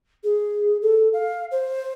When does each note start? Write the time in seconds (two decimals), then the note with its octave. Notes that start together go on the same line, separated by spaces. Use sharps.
0.23 G#4
0.81 A4
1.13 F5
1.51 C5